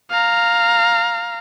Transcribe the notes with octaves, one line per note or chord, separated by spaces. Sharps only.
F5 A#5